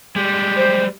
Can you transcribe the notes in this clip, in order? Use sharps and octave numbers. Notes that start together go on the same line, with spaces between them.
G3 G#3 G4
C5